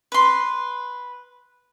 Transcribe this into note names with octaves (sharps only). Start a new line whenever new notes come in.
B4 C6